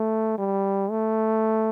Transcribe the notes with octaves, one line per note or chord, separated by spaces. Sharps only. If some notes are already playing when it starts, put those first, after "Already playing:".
Already playing: A3
G3
A3